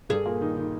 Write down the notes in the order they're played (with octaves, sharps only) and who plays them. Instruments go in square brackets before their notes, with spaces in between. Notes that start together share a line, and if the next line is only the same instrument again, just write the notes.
[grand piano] G2 G3 [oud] G#4
[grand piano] A#2 A#3
D#3 D#4
D#3 D#4